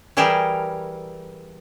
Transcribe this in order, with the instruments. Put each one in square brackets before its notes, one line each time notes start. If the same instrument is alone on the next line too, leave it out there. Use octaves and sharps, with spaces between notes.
[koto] E3 G3 E4 G4 G#4 A#4